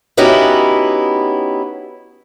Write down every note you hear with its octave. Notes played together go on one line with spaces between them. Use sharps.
B3 C#4 D#4 E4 F#4 G4